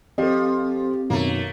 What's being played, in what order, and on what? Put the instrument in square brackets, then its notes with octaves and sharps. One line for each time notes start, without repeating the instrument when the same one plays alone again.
[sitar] F3 [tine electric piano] C4 [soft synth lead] G4 [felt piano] A4 D#5
[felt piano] F#2 B2 D#3 [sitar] A3 A#3